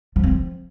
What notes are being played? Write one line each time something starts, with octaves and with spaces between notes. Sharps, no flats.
F3
C4
F3